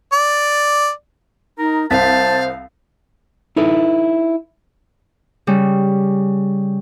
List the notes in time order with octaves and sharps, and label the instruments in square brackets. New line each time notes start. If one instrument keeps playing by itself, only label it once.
[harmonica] D5
[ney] D#4 [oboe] A#4
[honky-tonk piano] C2 B6 [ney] C5 [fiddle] F5 [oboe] A5
[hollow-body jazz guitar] D#4 E4 A4 B4
[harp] C#3 G3